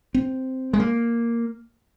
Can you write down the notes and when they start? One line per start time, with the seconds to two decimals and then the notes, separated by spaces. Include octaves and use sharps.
0.14 C4
0.73 G#3
0.80 A#3